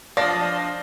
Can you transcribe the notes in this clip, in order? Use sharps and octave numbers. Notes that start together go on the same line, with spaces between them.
F3 D4 D5 D#5 F5 A5 A#6